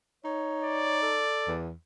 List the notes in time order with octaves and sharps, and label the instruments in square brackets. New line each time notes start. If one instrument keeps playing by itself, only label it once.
[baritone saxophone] D#4 [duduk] C#5
[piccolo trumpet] D5
[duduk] A4
[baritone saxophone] E2